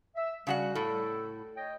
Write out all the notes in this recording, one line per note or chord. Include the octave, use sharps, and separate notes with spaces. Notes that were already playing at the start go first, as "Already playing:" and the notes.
E5
C#3 G3 F#4 F#5
A2 A4
C#5 D#5 G5